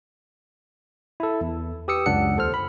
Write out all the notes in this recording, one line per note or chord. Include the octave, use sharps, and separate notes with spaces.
E4 A4
E2
G4 B4 D#6 E6 C#7
C#2 F#2 D4 F#5 C#7
D#2 A4 C5 F6
B5